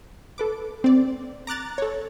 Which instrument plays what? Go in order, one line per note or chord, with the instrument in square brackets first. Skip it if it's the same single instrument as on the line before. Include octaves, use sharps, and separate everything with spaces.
[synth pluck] A4 B4 D6
C4 D5
A#5 D6 F#6 A6
A4 C#5